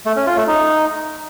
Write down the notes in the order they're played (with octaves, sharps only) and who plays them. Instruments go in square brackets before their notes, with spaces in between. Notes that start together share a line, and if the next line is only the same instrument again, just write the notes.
[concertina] A3
C#4
F4
A3
D#4